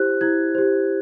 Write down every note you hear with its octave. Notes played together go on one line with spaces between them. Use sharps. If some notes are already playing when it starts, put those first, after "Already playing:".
Already playing: E4 G4 C5 F#6
E4 G#6
G4 C5